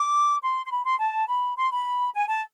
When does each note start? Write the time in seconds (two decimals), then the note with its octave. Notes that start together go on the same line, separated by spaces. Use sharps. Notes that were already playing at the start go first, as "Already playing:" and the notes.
Already playing: D6
0.42 C6
0.65 C6
0.70 B5
0.84 C6
0.99 A5
1.28 B5
1.57 C6
1.71 B5
2.14 G#5
2.28 A5